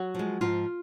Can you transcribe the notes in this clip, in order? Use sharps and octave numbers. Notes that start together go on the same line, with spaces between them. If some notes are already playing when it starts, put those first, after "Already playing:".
Already playing: F#3 F#4
F3 G#3
G#2 F3 F4